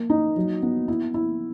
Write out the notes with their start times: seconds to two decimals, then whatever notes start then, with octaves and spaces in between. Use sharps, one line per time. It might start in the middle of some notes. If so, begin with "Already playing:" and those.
Already playing: A#3
0.10 D#4
0.36 F#3
0.63 B3
0.88 E4
1.14 E4